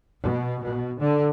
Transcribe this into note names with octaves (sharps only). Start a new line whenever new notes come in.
B2
B2
D3